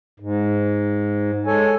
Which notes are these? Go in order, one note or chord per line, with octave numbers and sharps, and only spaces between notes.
G#2
G#3 A4 C#5 G#5